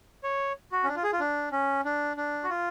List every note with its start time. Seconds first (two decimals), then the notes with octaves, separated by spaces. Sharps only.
0.23 C#5
0.72 F#4
0.84 C#4
0.88 D4
0.96 F4
1.03 G#4
1.13 F4
1.20 D4
1.52 C#4
1.85 D4
2.17 D4
2.44 F#4
2.50 F4